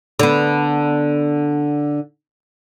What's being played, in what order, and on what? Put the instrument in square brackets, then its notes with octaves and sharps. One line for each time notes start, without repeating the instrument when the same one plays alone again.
[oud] D3 B3